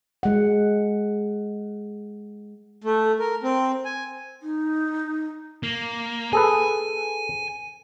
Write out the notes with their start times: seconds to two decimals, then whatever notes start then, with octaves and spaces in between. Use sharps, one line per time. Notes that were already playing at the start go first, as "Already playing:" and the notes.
0.23 G#3 F#5
2.84 A3
3.19 A#4
3.43 C4
3.85 G#5
4.43 D#4
5.63 A#3
6.33 G#4 A4 B4 G#5